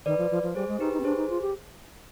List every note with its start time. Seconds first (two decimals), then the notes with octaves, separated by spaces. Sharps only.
0.06 D#3 B4 D5
0.18 F3
0.31 F3
0.43 F3
0.55 G3 G#4 C5
0.68 G#3
0.80 D#4 G4 B4
0.93 D#4
1.00 C4
1.04 D4 G#4 C5
1.17 D#4
1.30 F4
1.41 G4